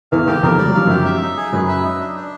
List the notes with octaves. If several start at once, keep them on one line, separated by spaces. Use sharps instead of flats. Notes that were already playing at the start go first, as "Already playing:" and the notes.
E2 E3 F5
D#2 D#3 G4
F2 F3 A#4
G3 D5
F#3
F3 F5
F#2 F#3 G4
E5
D#4
G#4
F#2 F#3 B4
E5
D#4
D4
D4